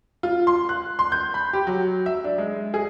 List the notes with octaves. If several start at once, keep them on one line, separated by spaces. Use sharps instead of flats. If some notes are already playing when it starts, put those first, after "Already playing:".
F4
C6
F#6
C6
G6
B5
G4
F#3
E5
D4
G#3
G#4